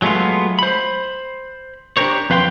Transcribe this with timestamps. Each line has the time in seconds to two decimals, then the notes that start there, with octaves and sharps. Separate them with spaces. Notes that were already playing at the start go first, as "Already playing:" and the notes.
0.02 F#3 G#3 A3 B3 F4
0.59 C5 B5
1.97 D4 G4 A4 A#4 C5 C#5
2.30 F2 B4 F5 G5 C6